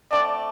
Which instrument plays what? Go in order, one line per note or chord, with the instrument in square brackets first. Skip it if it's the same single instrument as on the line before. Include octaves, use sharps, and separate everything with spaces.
[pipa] D3 A3 C4 [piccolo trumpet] D5